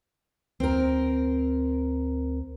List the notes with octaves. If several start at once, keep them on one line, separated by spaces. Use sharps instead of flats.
D2 C4 A#4